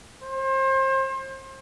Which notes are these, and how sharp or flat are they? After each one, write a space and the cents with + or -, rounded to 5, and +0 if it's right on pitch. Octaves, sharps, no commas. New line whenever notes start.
C5 +35